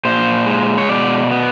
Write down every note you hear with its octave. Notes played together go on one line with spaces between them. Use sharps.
A#2 C5
G#3
C#5
B2 D5
B3